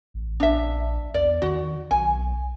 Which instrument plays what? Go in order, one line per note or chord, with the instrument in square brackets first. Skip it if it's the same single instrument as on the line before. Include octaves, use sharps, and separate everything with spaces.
[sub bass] A1
[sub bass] A#1 [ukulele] D4 E5
[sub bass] E2 [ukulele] D5
[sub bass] D#3 [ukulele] F#4
[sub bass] B1 [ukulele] G#5